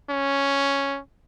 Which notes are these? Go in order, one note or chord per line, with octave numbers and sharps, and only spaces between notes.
C#4